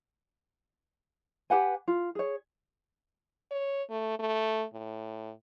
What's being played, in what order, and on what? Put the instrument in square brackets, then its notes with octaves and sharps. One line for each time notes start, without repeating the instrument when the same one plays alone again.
[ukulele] G4 B4 F#5 G#5
F4
G#4 C#5
[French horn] C#5
A3
A3
A2